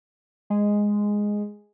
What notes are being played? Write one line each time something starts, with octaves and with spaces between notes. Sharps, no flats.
G#3